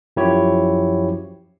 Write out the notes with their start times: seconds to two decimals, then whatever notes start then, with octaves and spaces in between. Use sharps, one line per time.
0.17 F#2 F3 E4 F#4 G4 C#5